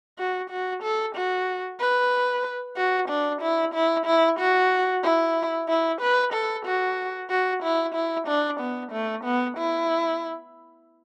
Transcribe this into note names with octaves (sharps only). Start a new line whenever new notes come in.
F#4
F#4
A4
F#4
B4
F#4
D4
E4
E4
E4
F#4
E4
E4
B4
A4
F#4
F#4
E4
E4
D4
B3
A3
B3
E4